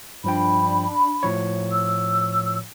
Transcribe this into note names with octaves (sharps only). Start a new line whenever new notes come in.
G2 F3 D4 G5 B5
A2 F3 C#5
E6